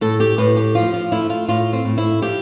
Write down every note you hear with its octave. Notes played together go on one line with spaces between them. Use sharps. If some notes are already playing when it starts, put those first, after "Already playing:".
A2 A4
G4
A2 B4
G4
F3 F4
F4
A3 E4
F4
A2 F4
C4
A2
E4
F3 G4